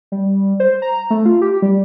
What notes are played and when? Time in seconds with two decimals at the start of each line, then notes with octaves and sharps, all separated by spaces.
0.12 G3
0.60 C5
0.82 A#5
1.10 A3
1.25 F4
1.42 G4
1.62 G3